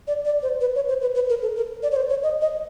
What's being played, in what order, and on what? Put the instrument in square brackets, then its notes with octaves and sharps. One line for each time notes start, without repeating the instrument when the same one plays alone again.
[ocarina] D5
D5
C5
B4
C#5
C5
B4
B4
A#4
A4
A#4
D5
C#5
C5
C#5
D#5
D#5